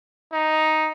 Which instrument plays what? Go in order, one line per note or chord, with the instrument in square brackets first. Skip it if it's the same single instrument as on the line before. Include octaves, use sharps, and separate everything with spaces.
[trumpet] D#4